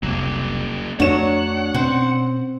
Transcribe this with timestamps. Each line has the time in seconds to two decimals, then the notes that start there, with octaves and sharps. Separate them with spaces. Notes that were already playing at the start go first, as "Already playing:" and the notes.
0.03 F1 C2 F#3 A#3
1.00 F2 F#3 A3 D4 C#5 F#5 E7
1.74 B2 C4 C#4 C5